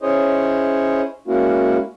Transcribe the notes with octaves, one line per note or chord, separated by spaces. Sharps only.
C#4 E4 G#4 C5 C#5 D#5
G#3 A#3 C#4 E4 F#4